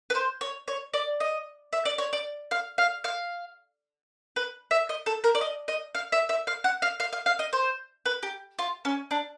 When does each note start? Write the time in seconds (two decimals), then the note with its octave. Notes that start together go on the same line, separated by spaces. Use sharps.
0.10 B4
0.15 C5
0.41 C#5
0.68 C#5
0.94 D5
1.20 D#5
1.73 E5
1.85 D5
1.98 C#5
2.13 D5
2.51 F5
2.78 F5
3.04 F5
4.36 B4
4.71 E5
4.89 D#5
5.06 A4
5.24 A#4
5.35 D5
5.41 D#5
5.68 D#5
5.95 F5
6.12 E5
6.29 E5
6.47 F5
6.64 F#5
6.82 F5
7.00 F5
7.13 F5
7.26 F5
7.39 D#5
7.53 C5
8.05 B4
8.23 G4
8.59 F4
8.85 C#4
9.11 D4